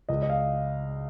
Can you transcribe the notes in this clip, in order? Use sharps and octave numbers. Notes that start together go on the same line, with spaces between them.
C#2 D#5
D#5
F5